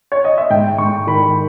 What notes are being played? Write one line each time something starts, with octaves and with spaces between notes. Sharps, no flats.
C#5
D#5
E5
G#2 G5
G#2 C#6
D#3 B5